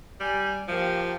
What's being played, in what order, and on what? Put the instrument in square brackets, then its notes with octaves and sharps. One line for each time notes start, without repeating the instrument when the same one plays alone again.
[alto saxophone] G3 [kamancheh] G#5
[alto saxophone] F3 [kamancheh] A#3 G4